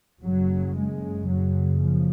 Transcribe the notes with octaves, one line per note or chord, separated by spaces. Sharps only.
F#1 F#2 C#3 F#3
G#3
F#1 F#2 C#3 F#3
F3